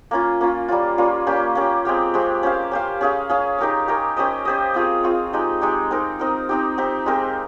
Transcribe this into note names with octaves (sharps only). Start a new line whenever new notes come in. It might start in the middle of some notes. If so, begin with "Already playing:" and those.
A#3 C#4 F4
A#3 C#4 F4
G3 A#3 C#4 F4
G3 A#3 C#4 F4
A#3 C#4 G4
A#3 C#4 G4
G#3 C4 G4 C#5
G#3 C4 G4 C#5
C#4 G4 C5 F5
C#4 G4 C5 F5
C#4 G#4 C#5 F5
C#4 G#4 C#5 F5
D#4 G4 A#4 C#5
D#4 G4 A#4 C#5
C#4 G4 C5 D#5
C#4 G4 C5 D#5
C4 F4 G#4 C#5
C4 F4 G#4 C#5
G#3 D#4 G4
G#3 D#4 G4
C4 D#4 A#4
C4 D#4 A#4
C4 D#4 G4
C4 D#4 G4
G#3 C4 G4 A#4